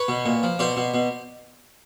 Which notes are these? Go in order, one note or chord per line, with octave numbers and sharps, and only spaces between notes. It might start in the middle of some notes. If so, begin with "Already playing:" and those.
Already playing: B4 C#5
B2
A#2
F3
B2 C5 D5
B2
B2